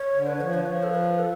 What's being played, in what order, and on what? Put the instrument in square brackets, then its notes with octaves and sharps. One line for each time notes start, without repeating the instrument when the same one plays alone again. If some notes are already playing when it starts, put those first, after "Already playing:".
Already playing: [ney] C#5
[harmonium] D3
[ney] B4
[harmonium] F3 [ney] C#5
[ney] B4
[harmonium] F3 [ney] C#5
[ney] A4
B4
A4